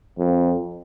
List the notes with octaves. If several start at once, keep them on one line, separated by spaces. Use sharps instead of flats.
F2